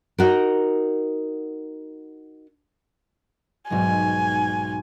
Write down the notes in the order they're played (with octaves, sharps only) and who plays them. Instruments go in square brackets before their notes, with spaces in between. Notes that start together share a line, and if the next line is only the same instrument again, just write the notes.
[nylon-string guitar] D#4 F#4 A#4
[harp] B1 G#2 G#3 [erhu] G#5